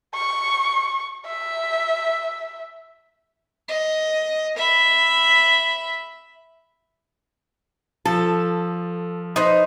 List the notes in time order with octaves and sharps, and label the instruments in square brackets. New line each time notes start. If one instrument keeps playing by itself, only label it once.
[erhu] C#6
E5
[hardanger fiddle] D#5
E5 B5
[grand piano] F3 [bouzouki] A4
[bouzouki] D#4 B4 C5